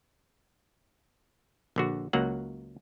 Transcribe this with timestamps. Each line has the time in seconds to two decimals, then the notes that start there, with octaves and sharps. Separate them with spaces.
1.76 A#1 D3 F#4
2.13 C#2 F#3 A#3 F#5